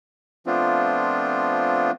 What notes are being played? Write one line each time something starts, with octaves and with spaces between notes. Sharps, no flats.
F3 A3 B3 C4 D4 F4